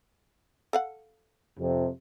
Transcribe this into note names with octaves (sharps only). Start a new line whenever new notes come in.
A4 F5 F#5
F2 C3